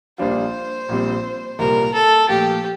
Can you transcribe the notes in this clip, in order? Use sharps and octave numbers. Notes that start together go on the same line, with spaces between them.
A#1 A#2 G3 D4 F4 C5
A#1 A#2 G3 C4
C2 A#2 G3 A#4
A4
A#2 F3 A3 G4